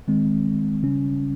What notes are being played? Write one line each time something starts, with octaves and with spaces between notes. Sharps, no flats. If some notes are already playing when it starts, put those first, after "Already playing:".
D#3 G#3 C4
C#3 G3 C#4